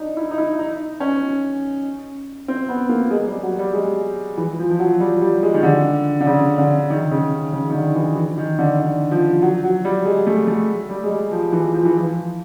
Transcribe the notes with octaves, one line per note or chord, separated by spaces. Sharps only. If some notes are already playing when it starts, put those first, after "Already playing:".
Already playing: D4 D#4
E4
D#4
E4
D#4
C#4
C4
B3
A#3
G#3
G3
F#3
G3
G#3
E3
F3
F3
F#3
G3
G3
G#3
D#3
D3
D3
C#3
D3
D#3
C#3
C#3
D#3
D3
E3
E3
D#3
D3
D3
F3
F#3
F#3
G3
G#3
A3
A3
G3
G#3
G3
F3
E3
F3
E3
F3